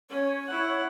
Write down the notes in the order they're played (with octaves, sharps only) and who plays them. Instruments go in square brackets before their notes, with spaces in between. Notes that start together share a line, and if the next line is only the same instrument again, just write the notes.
[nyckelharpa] C#4 [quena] C#5
[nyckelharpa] E4 F#5